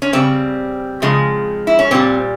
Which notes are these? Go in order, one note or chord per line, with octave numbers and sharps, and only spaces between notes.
C#4
C#3 G3 C4
C#3 F3 G#3
E4
C#4
A#2 G3 C4